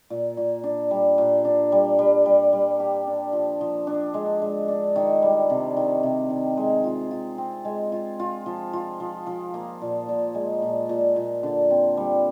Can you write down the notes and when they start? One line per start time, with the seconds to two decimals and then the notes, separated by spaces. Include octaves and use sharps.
0.10 A#2
0.37 A#2
0.64 D4
0.91 G3
1.18 A#2
1.45 D4
1.72 G3
1.99 G3
2.26 G3
2.53 G3
2.80 G4
3.07 D4
3.33 F3
3.61 F3
3.87 D4
4.14 G#3
4.42 G#3
4.68 D4
4.96 D#3
5.22 G3
5.50 C3
5.77 D#3
6.03 C3
6.30 D#3
6.57 G#3
6.84 F4
7.11 F4
7.38 C4
7.65 G#3
7.92 F4
8.20 F4
8.46 F3
8.73 F4
9.00 F3
9.27 F3
9.54 A#3
9.82 A#2
10.09 A#2
10.35 G#3
10.62 A#2
10.89 A#2
11.16 A#2
11.43 D3
11.71 C4
11.97 G3